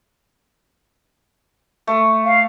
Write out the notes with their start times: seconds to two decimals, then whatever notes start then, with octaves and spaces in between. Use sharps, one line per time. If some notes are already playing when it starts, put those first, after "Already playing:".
1.87 A3
2.25 F5